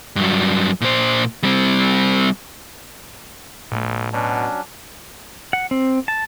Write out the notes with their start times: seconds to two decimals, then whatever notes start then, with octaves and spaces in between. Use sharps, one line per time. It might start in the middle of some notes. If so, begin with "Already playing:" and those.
0.16 G2 F#3
0.81 A#2 C5
1.43 G3 C4
3.72 B1 A2 A3
4.13 B2 F#3 C#4 D4
5.53 F#5
5.71 C4
6.08 A5